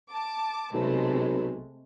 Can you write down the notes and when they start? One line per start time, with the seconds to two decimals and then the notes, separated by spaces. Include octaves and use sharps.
0.12 A5 D6
0.74 B1 C3 G#3 A3